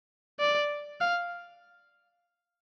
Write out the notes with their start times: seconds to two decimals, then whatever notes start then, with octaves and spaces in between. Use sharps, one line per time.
0.40 D5
1.00 F5